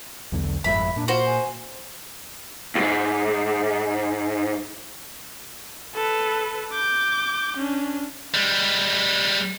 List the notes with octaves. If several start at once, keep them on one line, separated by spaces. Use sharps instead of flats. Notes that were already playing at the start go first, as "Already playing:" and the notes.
B1 E2 D3
G1 F2 G#2 E5 B5
A#2 D4
F4 F#4 C5
G#5
C#2 G#2
A4 B4
D6 G6
C#4 D4
G3 G#3